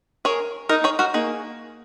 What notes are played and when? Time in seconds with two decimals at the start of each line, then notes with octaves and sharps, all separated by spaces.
0.25 G#4 A#4 C#5
0.69 D#4 A#4 D#5
0.84 G#4 C#5
0.99 F#4 A#4
1.14 A#3 D#4 G#4